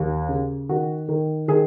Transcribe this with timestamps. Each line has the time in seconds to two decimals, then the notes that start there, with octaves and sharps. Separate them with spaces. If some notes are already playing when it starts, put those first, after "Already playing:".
Already playing: D#2
0.29 C#3
0.69 D#3 F#4
1.08 D#3
1.48 D#3 G#4